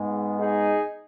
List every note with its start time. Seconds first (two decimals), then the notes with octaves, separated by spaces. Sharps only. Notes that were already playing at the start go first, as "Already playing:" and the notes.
Already playing: G#2 G#3 B3
0.38 D#4 G#4